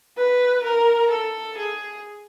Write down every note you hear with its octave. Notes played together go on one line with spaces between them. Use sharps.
B4
A#4
A4
G#4